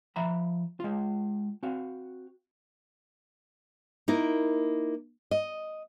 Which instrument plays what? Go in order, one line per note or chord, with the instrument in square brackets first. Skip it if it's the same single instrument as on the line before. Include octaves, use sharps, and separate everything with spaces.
[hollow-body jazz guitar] F3 E5 A#5 B5
G#3 F4
C4 F#4 F5
[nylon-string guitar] A#3 D#4 E4 A#4
D#5